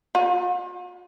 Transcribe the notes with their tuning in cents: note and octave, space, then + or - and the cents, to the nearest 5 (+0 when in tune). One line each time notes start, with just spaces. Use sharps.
F4 +45